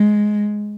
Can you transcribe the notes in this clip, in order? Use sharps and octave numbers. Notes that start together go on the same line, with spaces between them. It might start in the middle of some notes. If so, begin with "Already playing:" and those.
Already playing: G#3